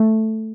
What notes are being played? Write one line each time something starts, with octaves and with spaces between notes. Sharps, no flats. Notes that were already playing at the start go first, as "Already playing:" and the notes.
Already playing: A3